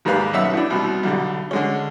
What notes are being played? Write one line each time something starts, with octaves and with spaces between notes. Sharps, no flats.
D#2 G#2 G3 B4 F5 B5
B1 C#4 E5 F#5 E6
A2 D4
C2 B2
B1 D3 G3
D3 G#3 C#4